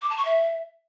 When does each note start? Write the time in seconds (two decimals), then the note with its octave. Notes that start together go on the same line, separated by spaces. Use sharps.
0.02 D6
0.09 A5
0.17 C#6
0.25 E5